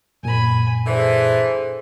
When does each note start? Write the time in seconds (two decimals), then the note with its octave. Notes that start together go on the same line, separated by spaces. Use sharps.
0.23 F#2 A#2 G#5 B5
0.86 D3 E3 G#4 C5